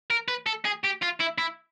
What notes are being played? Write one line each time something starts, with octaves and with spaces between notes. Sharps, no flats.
A#4
B4
A4
G#4
G4
F4
E4
E4